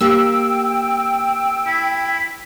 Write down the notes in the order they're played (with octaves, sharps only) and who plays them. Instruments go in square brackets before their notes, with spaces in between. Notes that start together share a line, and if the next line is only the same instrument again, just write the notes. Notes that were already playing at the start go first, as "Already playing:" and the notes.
[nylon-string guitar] A#3 G4 [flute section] G5 [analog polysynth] E6
[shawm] E4